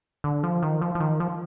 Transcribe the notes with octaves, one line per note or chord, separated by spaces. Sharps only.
D3
F3
D#3
F3
F3
D#3
F3